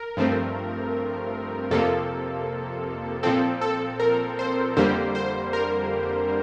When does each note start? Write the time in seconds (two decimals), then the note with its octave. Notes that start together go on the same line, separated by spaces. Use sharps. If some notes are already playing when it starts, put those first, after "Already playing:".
Already playing: A#4
0.17 G2 F3 A3 C4
1.71 F2 C3 F3 A#3 A4
3.23 A#2 F3 C4 A4
3.61 A4
4.00 A#4
4.39 C5
4.77 F2 D3 G3 A#3 C5
5.15 C5
5.53 A#4